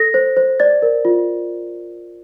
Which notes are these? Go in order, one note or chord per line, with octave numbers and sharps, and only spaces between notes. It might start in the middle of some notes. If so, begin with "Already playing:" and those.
Already playing: A4 A#6
C5
C5
D5 A6
A#4
F4